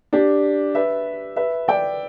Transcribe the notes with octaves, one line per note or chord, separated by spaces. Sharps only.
D4 G4
B4 E5
B4 E5
D5 G5